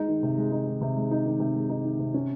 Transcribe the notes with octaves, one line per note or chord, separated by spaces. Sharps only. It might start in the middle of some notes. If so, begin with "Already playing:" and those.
Already playing: G#3 D#4
D#3
C3
G#3
D#4
D#3
C3
G#3
D#4
D#3
C3
G#3
D#4
D#3
C3
C#4